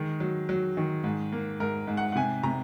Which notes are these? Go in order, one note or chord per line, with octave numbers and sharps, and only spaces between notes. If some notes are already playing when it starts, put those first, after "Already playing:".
Already playing: D#3 G#3
F#3
F#3
D#3
G#2
A#3
G#2 A#4
G#2
F#5
F#5
C3 G#5
C3 A#5